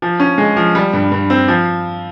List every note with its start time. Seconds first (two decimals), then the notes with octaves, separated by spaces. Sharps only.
0.02 F3
0.20 C#4
0.38 G#3
0.57 F3
0.75 G3
0.93 G2
1.12 G2
1.30 C4
1.48 F3